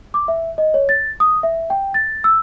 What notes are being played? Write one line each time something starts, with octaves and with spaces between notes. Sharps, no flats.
D6
E5
D#5
C#5
A6
D#6
E5
G5
A6
E6